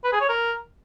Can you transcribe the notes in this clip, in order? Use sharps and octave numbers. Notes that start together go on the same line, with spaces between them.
B4
G#4
C#5
A#4